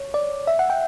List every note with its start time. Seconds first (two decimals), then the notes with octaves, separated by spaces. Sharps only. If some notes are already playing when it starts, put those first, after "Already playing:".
Already playing: C#5
0.14 D5
0.47 E5
0.59 F#5
0.70 G5